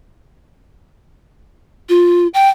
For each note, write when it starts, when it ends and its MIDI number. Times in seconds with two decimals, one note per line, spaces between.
1.89 2.27 65
2.34 2.49 79